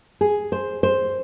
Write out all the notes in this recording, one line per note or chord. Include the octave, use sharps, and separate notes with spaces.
G#4
C5
C5